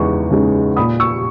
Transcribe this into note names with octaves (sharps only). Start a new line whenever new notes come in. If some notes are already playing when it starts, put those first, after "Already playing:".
Already playing: E2 C#3 G#3 D#4 C#6
C#3 G#3 D#4
A#2 B5 D#6
C#6 E6